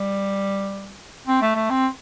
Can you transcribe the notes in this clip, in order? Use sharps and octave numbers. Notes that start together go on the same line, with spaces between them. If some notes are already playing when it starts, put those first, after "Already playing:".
Already playing: G3
C4
A3
A3
C4